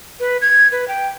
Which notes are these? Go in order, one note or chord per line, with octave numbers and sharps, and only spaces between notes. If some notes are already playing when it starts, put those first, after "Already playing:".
B4
G#6
B4
G5